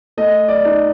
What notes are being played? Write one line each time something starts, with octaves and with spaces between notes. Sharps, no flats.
A3 D#5
D5
D#4